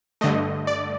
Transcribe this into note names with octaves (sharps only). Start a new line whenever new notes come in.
G2 D3 A3 D#5
D5